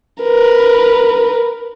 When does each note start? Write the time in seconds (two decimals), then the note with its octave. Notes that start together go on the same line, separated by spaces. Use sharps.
0.23 A#4 B4